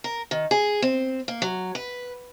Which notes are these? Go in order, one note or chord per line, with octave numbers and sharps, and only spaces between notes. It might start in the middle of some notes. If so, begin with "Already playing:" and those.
A#4
D#3
G#4
C4
A#3
F#3
B4